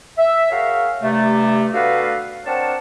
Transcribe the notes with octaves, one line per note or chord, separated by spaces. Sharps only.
E5
F#4 G#4 A#4 C#5 E5 F5
G2 C3 A3
B3 D4 F#4 A4 B4 F5
C4 D4 A#4 C#5 F#5 A5